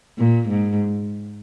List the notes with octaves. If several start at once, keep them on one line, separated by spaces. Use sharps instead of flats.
A#2
G#2